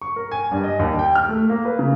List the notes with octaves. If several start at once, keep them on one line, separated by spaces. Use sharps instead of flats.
C#6
A#4
G#5
G2
D#5
D#2
G5
F6
A3
A#3
B4
C#3